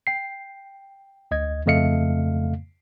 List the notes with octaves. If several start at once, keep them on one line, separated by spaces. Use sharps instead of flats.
G5 C7
D2 D#5 G#6
F2 C#3 A3 D#5 F5 C#7